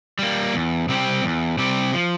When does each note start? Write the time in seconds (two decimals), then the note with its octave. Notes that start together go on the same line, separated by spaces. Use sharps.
0.19 G3 A#3
0.53 E2
0.89 C3 G3 C4 G4
1.24 E2
1.58 C3 G3 C4 G4
1.93 F3